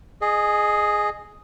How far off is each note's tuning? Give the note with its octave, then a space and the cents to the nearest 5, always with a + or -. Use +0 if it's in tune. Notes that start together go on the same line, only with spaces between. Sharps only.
G#4 +5 D#5 -20